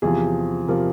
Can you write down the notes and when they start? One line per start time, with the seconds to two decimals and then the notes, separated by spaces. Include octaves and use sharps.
0.02 E2 C3 F3 G#4
0.68 C3 F3 A#4